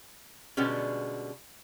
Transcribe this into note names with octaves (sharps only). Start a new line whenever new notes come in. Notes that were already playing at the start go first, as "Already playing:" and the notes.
B2 D3 G3 G#3 B3 C#4